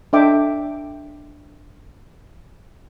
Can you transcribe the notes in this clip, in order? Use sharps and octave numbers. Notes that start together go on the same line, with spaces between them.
D4 A4 D#5 E5 G5 D6